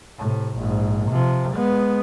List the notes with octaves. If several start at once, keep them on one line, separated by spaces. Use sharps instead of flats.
A2 C3
A#1 G#2
C3 F3
G#3 B3